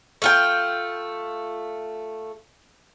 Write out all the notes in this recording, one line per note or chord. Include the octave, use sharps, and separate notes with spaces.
A3 F4 G5